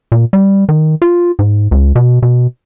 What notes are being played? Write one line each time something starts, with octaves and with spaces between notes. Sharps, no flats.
A#2
G3
D#3
F4
G#2
C#2
B2
B2